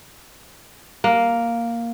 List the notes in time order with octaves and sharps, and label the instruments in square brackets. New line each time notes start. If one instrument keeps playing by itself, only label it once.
[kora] A#3